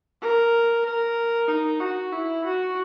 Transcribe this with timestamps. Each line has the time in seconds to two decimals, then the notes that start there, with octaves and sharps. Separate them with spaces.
0.21 A#4
0.85 A#4
1.49 D#4
1.80 F#4
2.12 E4
2.44 F#4